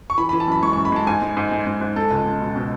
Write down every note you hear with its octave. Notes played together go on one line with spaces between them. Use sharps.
C#6
E3 B5
E3 B5
A5
F#2 B5
G#3 C#6
F#2 C#6
B5
G#3 A5
G#2 G#5
G#3
G#2
G#3
G#2
G#2
G#3 A4
C#2
G#3
B2
B2